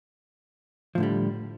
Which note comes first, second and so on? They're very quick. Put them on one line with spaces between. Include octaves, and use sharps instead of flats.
F3 A2 D3 G3